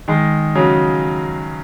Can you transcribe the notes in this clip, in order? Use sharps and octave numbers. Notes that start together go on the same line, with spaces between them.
D#3 G#3
C#3 F#3